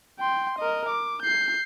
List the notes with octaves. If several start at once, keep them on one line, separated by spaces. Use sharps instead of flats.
G5 C6
A#4 D#5
D6
G6 C7